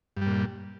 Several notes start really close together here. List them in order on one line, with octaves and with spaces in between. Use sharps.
G2 G3 A#2